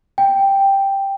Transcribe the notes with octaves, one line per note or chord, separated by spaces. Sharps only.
G5